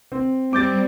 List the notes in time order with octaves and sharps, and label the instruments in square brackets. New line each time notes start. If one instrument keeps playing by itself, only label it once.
[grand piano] C4
[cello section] G3 C4 [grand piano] D6 G6 A6